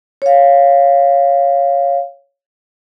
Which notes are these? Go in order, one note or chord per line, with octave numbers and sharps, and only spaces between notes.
C#5 F5